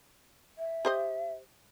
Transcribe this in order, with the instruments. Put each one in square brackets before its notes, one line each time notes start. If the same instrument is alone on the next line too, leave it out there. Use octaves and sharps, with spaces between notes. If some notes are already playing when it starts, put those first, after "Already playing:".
[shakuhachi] E5
[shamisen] G4 C5 D#5